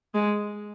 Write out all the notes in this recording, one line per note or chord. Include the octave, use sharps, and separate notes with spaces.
G#3